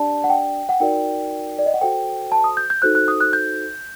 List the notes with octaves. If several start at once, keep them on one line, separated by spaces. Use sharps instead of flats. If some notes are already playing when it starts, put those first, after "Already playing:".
Already playing: D4 G4 D5 A5
F#5
G5
F#5
D#4 F#4 A#4 D5 G5
D5
D#5
F#5
F#4 A4 C5 G5
A5
D#6
G6
G6
D#4 F#4 A4 C5 F#6
F#6
D#6
F#6
G6